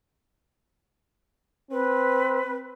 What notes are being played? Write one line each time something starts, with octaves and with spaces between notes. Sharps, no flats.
C4 B4